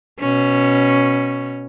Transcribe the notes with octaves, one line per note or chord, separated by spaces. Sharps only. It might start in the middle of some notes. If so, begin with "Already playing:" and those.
B2 C#4